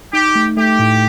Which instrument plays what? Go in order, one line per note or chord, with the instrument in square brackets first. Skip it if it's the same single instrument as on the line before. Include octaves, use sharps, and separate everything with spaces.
[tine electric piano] D#4 [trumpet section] G4
[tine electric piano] A3
[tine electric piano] A3 [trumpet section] G4
[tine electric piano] A2